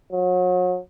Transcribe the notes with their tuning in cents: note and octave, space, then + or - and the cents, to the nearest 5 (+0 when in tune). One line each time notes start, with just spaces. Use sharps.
F#3 -35